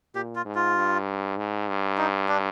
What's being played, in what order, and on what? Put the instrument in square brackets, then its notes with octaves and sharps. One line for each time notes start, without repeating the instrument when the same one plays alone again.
[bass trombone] A#2 [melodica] G4
[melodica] F4
[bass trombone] G#2
[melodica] F4
[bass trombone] G2
G#2
G2
[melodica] D#4
D4